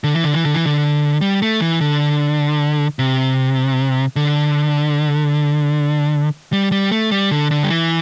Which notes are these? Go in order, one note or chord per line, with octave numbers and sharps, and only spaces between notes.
D3
E3
D3
E3
D3
E3
D3
G3
A3
E3
D3
C3
D3
G3
G3
A3
G3
D3
D3
G3
E3